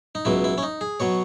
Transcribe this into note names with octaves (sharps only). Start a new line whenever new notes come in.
D#4
C#2 B2 F#3 E4
E4
C#4
D#4
G#4
B2 F#3 C#5